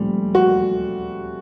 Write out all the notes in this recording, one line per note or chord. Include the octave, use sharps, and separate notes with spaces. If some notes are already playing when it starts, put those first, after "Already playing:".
Already playing: A#2 F3 G3 A3 C#4
F#4